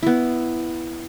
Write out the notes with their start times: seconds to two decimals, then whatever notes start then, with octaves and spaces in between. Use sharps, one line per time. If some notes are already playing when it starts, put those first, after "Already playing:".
0.03 B3 E4